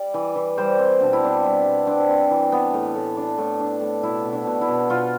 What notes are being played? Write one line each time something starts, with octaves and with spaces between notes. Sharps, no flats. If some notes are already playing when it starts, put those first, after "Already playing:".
Already playing: G3 D5
E3
E3
G3 C5
C4
B2 D4
E4
C4 D4
G3 E4
B2
C4 D4
C4
E3
B3
A2
A2
D4
A2
D4
A2
B2 E4
B2
D4
B2
E4
B2
B2 F4